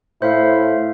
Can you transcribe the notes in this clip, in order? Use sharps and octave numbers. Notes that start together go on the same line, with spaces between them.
A2 E4 C5 E5 F5